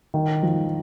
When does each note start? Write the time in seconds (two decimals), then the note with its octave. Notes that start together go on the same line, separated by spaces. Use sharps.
0.14 D#3
0.43 F3